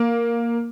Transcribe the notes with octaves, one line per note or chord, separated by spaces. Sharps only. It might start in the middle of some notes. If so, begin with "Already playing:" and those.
Already playing: A#3